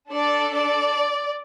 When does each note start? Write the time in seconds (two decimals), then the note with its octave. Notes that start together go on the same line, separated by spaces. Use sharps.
0.11 D4 A4 D5
0.53 D5